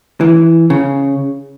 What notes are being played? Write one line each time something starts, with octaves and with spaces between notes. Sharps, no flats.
E3
C#3